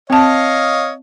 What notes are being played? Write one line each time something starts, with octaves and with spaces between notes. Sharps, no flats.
C4 C#5 D#5 F5 A5